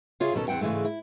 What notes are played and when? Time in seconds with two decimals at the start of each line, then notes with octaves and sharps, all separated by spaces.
0.20 C#3 F4 G#4 C#5 E5
0.34 D#2 B2 C#4 A4
0.48 E2 E3 C4 F#5 G5
0.61 G#2 C#3 E3 G#3 A3
0.85 E4